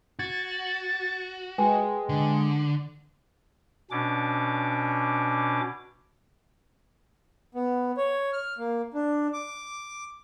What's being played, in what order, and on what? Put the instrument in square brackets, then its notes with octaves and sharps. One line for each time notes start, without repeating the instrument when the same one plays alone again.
[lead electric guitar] F#4 [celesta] G#6 [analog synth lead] A6
[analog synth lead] G#3 [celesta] B4 G5 G#5
[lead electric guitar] D3
[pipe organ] B2 C#4 D4 D6
[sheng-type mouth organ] B3
C#5
F6
A#3
D4
D6